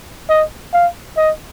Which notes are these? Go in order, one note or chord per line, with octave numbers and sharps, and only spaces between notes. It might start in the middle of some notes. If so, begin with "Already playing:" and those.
D#5
F5
D#5